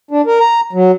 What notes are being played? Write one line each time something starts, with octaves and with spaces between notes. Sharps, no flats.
D4
A#4
A#5
F#3